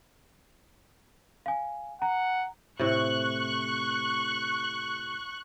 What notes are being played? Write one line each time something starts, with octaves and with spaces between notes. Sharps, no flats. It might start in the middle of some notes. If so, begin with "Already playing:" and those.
F5 G#5
F#5 A#5
A2 C3 C#6 F#6